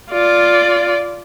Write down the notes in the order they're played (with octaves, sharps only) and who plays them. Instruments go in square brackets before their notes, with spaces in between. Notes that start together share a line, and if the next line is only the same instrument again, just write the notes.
[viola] F4 D5